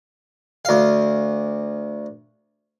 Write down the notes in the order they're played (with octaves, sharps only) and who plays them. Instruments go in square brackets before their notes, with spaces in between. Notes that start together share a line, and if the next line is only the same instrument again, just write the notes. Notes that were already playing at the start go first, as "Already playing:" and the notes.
[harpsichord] D2 F5